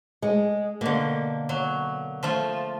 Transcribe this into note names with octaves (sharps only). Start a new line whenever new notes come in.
G#3
B2 D3 A#3
F#3
F3 A3 F4